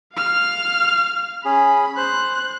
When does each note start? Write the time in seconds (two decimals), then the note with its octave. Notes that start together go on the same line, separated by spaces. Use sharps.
0.15 F5 F6
1.45 C#4 G#4 B5
1.97 C5 F#6